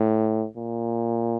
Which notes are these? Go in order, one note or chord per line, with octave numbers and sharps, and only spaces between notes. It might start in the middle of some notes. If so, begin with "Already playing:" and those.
Already playing: A2
A#2